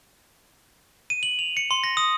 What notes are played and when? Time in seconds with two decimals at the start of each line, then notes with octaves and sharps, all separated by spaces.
1.10 D#7
1.23 F#7
1.39 F7
1.57 C#7
1.71 C6
1.84 A#6
1.97 D#6